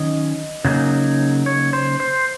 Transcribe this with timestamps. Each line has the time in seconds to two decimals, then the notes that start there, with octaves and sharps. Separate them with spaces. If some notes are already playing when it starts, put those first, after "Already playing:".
Already playing: D#3 F#3 C#4 D#5
0.65 C#3 F#3 A#3 D#4
1.46 C#5
1.73 C5
2.00 C5